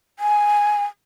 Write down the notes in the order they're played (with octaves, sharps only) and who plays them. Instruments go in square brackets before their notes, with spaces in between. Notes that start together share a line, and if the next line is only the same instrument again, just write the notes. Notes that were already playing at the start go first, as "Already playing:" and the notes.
[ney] G#5